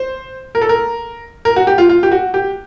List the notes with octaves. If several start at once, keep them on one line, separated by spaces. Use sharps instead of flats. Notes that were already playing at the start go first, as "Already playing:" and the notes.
Already playing: C5
A#4
A4
A#4
A#4
F#4
G4
F4
F4
G4
F#4
G4